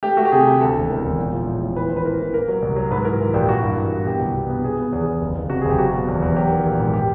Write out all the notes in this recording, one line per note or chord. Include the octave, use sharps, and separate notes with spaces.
A3 G4
A3 F#4
G4
C3 G#4
C3
D2 A4
E1
E3 A#4
E1
A#1
F3
A2
A2
E3 B4
A1 C5
B4
E3 A#4
E3
A#3 A#4
F#3
C2
F#3
G#2 B4
E3 A#4
E3
A#1 G4
A#3 F#4
G2
E3
E3
B2 G4
C2
B2
B3
B3 G#4
B3
E2 G#4
E2
F#1
F#1
C3 F#4
G#4
F#1 G4
F#3 F#4
B2
E2
E2
F#3 G4
D#3
A#1
G#2
G4